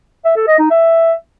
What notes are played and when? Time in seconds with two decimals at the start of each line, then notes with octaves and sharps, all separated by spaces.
0.25 E5
0.36 A4
0.48 D#5
0.59 D#4
0.70 E5